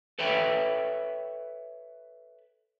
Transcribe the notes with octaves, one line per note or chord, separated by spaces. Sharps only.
A4 B4 C#5 E5 G5 B5